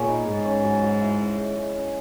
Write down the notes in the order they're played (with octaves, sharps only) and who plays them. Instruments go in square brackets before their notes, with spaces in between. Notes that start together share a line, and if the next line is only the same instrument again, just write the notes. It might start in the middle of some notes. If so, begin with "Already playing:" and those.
Already playing: [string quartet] A#2 [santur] B3 G#4 C#5
[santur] D#4
[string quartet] G#2 [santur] G#4
[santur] C#4
F#3
F#3
E4
C#4
G#3
G#3
C#4